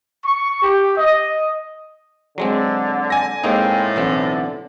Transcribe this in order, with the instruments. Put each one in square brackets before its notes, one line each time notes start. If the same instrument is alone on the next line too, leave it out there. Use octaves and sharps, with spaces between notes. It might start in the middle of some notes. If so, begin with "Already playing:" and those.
[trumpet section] C#6
G4
D#5
[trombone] D3 [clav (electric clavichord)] F#3 G#3 C4
[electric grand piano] G#5 A#6
[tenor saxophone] A2 [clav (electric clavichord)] G#3 A#3 D#4 [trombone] C4
[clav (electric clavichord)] B1 E3 C4 [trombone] D3